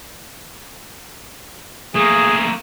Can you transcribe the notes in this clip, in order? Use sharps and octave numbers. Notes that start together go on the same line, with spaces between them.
A3 A#3 G#4